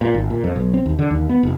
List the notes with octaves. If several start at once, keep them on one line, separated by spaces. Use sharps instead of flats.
A#2
G#1
A#2
F2
B1
C4
D#2
D3
D#2
B3
F1